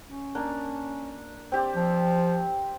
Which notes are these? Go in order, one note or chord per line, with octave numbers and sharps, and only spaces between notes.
C#4
A#3 D4
C4 G4 D5
F3